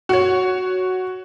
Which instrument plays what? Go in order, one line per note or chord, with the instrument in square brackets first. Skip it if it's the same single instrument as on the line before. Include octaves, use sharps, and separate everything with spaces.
[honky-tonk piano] F#4 C#5